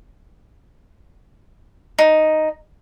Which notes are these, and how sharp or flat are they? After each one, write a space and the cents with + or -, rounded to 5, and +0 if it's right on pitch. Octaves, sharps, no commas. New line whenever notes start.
D#4 +0